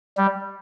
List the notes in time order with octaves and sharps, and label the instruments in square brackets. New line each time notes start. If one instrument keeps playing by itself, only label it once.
[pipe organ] G3